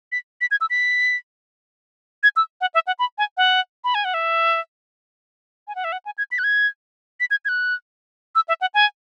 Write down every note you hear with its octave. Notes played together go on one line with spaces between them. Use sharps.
B6
B6
G#6
E6
B6
G#6
E6
F#5
E5
F#5
B5
G#5
F#5
B5
G#5
F#5
E5
G#5
F#5
E5
F#5
G#5
G#6
B6
F#6
G#6
B6
G#6
G#6
F#6
E6
E5
F#5
G#5